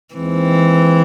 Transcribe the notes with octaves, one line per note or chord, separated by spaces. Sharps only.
D#2 D#3 E3 G#3 C4